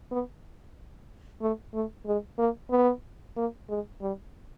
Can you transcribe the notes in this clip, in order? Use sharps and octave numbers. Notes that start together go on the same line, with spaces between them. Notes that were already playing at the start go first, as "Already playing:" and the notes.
B3
A3
A3
G#3
A#3
B3
A#3
G#3
G3